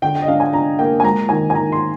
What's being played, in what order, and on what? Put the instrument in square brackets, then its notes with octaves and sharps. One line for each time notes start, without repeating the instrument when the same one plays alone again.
[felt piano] D3 [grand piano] G5
[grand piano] G5
D#5
[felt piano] D4 [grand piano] F5
[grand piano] G#5
[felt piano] D4 [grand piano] A#5
[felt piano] A#3 [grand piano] G5
[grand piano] G#5
[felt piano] G#3 [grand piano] A#5
[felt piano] D#3 [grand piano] G#5
[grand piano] G#5
[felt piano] D#3 [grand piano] A#5
[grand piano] C6